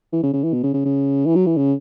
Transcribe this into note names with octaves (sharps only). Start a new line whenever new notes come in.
E3
C#3
C#3
E3
B2
C#3
C#3
C#3
E3
F#3
E3
C#3